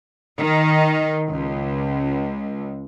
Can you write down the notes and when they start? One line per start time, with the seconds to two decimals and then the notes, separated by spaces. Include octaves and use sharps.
0.39 D#3
1.30 C#2